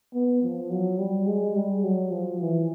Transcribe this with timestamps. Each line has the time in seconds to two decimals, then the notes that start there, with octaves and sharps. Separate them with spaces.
0.14 B3
0.43 F3
0.71 F#3
0.98 G3
1.27 G#3
1.55 G3
1.84 F#3
2.11 F3
2.40 E3